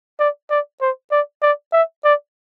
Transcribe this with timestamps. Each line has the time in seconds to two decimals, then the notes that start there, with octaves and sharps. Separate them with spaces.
0.19 D5
0.50 D5
0.81 C5
1.11 D5
1.42 D5
1.73 E5
2.04 D5